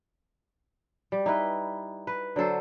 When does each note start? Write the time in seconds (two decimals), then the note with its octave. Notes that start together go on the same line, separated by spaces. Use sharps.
1.12 G3
1.26 D#4 E4 B4
2.07 B4
2.36 D3 F#3 A4 C5